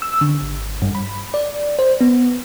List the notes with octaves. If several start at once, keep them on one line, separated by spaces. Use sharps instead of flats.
E6
D3
G#1
G2
B5
D5
C5
B3